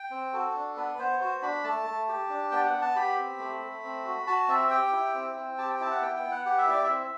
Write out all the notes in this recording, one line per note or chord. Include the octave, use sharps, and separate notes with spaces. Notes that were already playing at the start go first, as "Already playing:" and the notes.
Already playing: G5
C4
F#4 A4
D4
B3 B4
B3 C5
F#4 C5
D4 B5
A3 A5
A3
G4
D4
B3 G5
F#5
B3
A5
G4 B5
C4
A3
A3
C4
F#4
F#4 A5
C4 E5
G4 G5
E4
C4
C4
G4 A5
G5
E4 A5
F#5
B3 G5
G5
B3
F#5
G4 F#5
E5
E4 D5
E5
C4